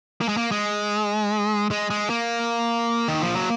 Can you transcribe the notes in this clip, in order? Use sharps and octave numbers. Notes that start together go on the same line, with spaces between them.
A#3
G#3
A#3
G#3
G#3
G#3
A#3
D#3
F3
F#3